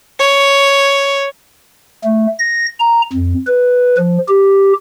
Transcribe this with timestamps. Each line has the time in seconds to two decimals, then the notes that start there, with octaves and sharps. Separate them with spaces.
0.20 C#5
2.04 A3
2.39 A#6
2.80 A#5
3.13 F2
3.47 B4
3.98 F3
4.29 G4